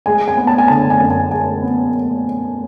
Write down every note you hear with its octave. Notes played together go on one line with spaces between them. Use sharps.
G#3 G#5
G#5
B3
A5
G#5
D3 A5
G#5
F#2
G#5
G#3 G#5
B3